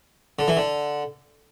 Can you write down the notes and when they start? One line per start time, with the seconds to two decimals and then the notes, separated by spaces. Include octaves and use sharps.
0.39 D3
0.48 E3
0.57 D3